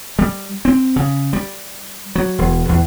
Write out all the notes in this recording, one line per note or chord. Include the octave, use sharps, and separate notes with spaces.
G3
C4
C#3
G3
F#3
E1
E2